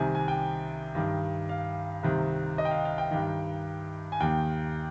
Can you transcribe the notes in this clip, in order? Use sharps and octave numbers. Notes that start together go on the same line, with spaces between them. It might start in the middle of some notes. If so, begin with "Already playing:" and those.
Already playing: C2 C3 D#3 G#5
G#5
G5
G2 D#3
F5
C2 C3 D#3
D#5
G5
F5
F5
G5
G2 D#3
G#5
D#2 D#3 G5